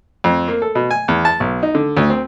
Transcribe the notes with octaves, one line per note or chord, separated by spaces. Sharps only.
F2
A#3
A4
B2
G#5
E2
A5
B1
D#4
D3
D2
C4